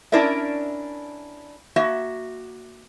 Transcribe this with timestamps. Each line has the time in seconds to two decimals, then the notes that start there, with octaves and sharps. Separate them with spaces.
0.12 C#4 D4 E4 A#4 D5 E5
1.76 A#3 F#4 E5